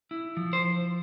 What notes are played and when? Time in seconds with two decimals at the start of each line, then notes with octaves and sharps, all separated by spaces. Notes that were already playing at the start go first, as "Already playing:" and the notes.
0.11 E4
0.37 F3
0.53 C5